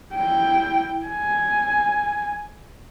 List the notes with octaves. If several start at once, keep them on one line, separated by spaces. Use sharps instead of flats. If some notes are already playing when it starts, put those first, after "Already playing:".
E4 G5
G#5